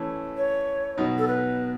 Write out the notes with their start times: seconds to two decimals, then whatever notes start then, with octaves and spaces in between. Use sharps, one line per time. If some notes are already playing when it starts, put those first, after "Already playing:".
Already playing: E3 A3 C#4 E4
0.37 C#5
0.98 B2 F#3 B3 D#4
1.18 A4
1.28 B4